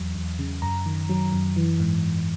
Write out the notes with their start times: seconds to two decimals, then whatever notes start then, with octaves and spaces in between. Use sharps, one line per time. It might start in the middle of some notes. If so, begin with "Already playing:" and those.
Already playing: E2 F#3
0.15 E2
0.39 C#3
0.62 F#2 A#5
0.86 D#3
1.09 F#3
1.32 F#2
1.56 E3
1.80 G#2
2.04 G#2